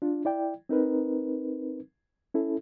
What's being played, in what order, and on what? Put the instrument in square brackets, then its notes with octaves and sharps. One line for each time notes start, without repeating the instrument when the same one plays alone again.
[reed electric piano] D4 F4
E4 D5 G5
C4 D#4 A#4 B4
C#4 E4 A4